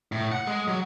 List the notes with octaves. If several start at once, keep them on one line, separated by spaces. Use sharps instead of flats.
A2
F#5
G#3
F#3